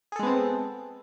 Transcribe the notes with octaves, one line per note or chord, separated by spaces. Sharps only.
G#3 B3 C4 G#4 A4